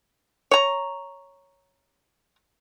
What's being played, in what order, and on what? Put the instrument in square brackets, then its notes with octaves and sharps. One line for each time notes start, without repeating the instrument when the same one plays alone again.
[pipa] C#5 A#5